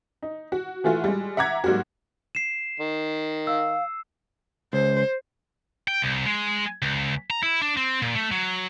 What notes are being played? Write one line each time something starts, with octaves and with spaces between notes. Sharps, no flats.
D#4
F#4
E3 A3 F4 F#4
G3 G#3
E5 F#5 A#5 D6 G#6
G#2 F#3 G3 A#3 F#4
C7 E7
D#3
F5 E6
C#2 C5
G5
C2
G#3
C#2
A#5
E4
D4
C4
A#2
A3
F#3